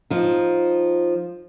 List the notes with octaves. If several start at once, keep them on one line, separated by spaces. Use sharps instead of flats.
F3 D#4